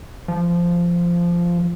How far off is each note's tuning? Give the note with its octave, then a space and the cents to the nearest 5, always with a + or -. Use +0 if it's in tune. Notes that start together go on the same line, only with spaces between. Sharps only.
F3 -10